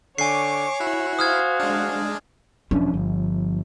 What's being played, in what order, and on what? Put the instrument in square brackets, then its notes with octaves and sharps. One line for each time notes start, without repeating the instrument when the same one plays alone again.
[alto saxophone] D3 [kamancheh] C#5 [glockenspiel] G#5 C7 [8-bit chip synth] C#6 D6
[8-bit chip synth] E4 [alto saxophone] F#4
[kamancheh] C5 F5 [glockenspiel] D#6 F6 G#6
[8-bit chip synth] G#3 D4
[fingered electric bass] E1 C#4 D4 [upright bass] F3
[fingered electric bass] G1